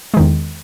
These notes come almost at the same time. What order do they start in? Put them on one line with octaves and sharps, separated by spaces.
G#3 D#3 E2